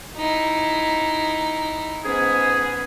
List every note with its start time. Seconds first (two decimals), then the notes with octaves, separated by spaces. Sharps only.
0.16 D#4 E4
2.05 G#2 B3 C#4 G#4